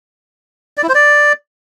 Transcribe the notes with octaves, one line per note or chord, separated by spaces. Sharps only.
D5
E4
C5
D5